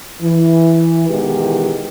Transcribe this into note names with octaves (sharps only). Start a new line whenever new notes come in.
E3
B2 D#3 E3 G#3 F#4 G4